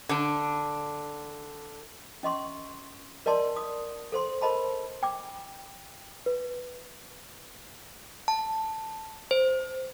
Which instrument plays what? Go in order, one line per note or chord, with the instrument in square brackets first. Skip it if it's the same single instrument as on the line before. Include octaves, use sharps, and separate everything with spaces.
[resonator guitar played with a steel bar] D3 D4
[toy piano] C#4 D#5 C6 C#6
A#4 D5 D#5 A5 C6
D#6
A4 C5 C6
A#4 C5 D#5 A5 B5
G5 D6
[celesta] B4
[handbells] A5
C5